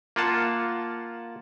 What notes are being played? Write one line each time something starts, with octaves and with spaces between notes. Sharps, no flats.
A#3 F4 F#5 A5